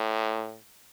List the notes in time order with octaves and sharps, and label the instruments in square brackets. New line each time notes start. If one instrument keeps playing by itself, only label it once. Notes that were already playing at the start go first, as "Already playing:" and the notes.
Already playing: [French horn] A2